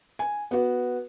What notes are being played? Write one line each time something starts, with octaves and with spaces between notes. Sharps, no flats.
G#5
B3 F#4